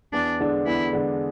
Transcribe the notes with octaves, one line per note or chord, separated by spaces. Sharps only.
E2 D4
D3 G#3 D4
E2 E4
D3 G#3 D4